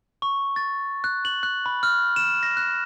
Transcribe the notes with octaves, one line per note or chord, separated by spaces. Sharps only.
C#6
A6
F#6
F#7
F#6
B5
F6
E7
A#6
F#6